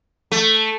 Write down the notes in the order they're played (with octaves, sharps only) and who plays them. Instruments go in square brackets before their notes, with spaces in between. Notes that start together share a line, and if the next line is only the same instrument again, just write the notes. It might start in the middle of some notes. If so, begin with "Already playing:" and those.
[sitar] A3